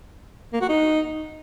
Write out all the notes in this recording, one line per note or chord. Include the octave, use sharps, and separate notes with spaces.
A#3
F#4
D#4